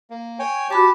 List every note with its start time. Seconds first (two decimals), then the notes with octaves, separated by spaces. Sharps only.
0.10 A#3
0.39 C#5 G5 G#5
0.70 F#4 G4 A5 B5 D6